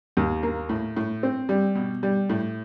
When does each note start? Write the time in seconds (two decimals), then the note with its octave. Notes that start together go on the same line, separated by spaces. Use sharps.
0.17 D#2
0.43 A#3
0.69 A2
0.96 A2
1.23 C4
1.49 G3
1.75 B2
2.03 G3
2.30 A2